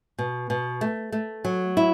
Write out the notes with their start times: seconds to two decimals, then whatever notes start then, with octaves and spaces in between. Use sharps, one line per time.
0.18 B2
0.50 B2
0.81 A3
1.12 A3
1.45 F#3
1.77 E4